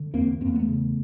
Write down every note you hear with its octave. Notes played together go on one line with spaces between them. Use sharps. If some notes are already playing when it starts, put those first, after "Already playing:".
Already playing: D3
E2 A#3 C4
E2 A#3 C4
A3 B3
C#3